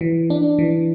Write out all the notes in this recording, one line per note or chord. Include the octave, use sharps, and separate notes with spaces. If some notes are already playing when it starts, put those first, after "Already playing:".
E3
D4
E3